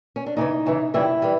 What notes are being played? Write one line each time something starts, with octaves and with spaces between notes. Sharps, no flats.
C#4
D4
E2 C#3 E3 D#4
E2 C#3 E3
F2 C#3 E3 G3 E4
E3 G3